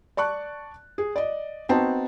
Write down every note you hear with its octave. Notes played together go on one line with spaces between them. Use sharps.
D5 A5 C#6 F#6
G#4
D5 D#5
B3 C4 D#4 F#4 A5